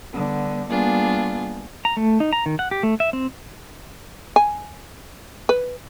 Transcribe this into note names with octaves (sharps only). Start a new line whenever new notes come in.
D3 G3 B3
G3 A#3 B3 D4 F4 G#4
A#5
A3
D#4
A#5
D#3
F#5
G4
A3
E5
C4
G#5
B4